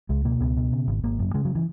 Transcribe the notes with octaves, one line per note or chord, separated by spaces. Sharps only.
C#2 G#3
B2 A#3
C#2 B3
B2
C#3
G#1
G#1 A#3
F#2
C#3 G#3
F#3
E3